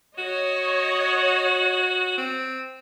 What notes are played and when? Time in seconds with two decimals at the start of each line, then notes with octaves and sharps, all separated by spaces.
0.18 F#4 C#5 D#5
2.17 C4